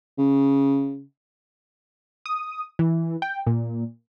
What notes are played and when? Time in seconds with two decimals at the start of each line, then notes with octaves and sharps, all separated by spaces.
0.18 C#3
2.26 D#6
2.79 E3
3.22 G5
3.47 A#2